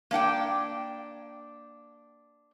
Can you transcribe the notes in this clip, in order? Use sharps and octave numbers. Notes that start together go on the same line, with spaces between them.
A#3 D4 F#5 G5